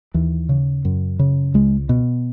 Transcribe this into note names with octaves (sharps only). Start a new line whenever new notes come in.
D#2 E3
C#3
F#2
C#3
C#2 G#3
B2